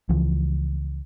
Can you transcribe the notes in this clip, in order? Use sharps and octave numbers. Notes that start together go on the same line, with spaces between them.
C#2 E3 F3